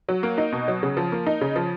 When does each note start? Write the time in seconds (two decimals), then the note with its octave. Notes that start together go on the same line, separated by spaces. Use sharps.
0.09 F#3
0.23 A#3
0.38 D#4
0.52 B2
0.68 F#3
0.83 C#3
0.97 F3
1.12 A#3
1.26 D#4
1.41 C#3
1.56 F3